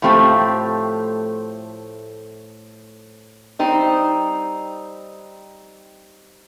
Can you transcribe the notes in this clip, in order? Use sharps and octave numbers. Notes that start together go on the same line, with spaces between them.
A2 F3 A3 C4 G4
G3 C4 D#4